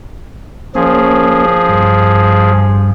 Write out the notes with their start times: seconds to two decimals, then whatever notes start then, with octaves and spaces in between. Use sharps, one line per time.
0.75 F3 A#3 C#4 G#4
1.69 G2